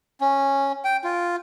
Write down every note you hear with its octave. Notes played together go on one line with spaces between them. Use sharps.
C#4
G5
F4